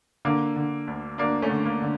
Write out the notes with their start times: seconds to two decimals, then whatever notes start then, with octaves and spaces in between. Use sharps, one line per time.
0.25 D3 A#3
0.56 D3
0.88 D2
1.18 D2 A#3 D4
1.42 A3 C#4
1.50 D3
1.66 A#3
1.82 D3